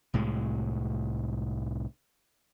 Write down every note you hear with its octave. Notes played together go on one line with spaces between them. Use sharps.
C2 A2 G#3